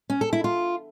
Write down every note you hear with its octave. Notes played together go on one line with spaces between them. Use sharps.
C#4
A4
E4
F4